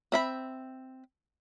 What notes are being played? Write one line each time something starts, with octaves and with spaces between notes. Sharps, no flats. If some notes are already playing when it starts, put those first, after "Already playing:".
C4 E5 B5